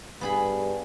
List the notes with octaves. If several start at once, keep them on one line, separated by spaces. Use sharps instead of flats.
G2 B3 G#4 B5